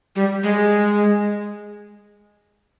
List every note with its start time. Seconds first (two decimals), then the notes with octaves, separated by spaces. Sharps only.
0.16 G3
0.44 G#3